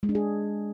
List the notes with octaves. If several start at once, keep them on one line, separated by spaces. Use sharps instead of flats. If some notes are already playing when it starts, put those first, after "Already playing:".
G#3
D4
G#4